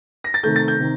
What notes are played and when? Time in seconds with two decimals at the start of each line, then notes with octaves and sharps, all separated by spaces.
0.24 A#6
0.34 A6
0.43 C3 D#3 A3 G6
0.56 A6
0.68 G6
0.80 C3 D#3